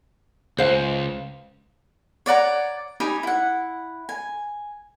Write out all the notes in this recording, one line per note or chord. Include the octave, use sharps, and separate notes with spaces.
C#2 C5 F5
C#5 D5 F#5 A#5
D#4 G4 G#5 B5
E4 F#5
G#5